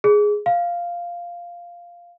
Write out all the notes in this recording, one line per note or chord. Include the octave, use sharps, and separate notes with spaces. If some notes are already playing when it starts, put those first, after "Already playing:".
G#4
F5